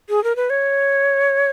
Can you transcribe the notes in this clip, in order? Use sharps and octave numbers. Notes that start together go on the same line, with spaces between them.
G#4
A#4
B4
C#5